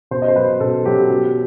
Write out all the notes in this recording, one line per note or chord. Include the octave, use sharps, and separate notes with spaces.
B2 C5
D#5
C5
F#3 B4
B2 A4
F#3 G4
B2